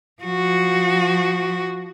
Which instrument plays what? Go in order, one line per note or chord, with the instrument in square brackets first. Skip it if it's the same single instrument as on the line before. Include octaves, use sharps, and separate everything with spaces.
[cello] F3 F#4